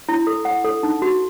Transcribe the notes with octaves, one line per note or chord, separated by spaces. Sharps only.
E4
A4
F#5
A4
D#4
F#4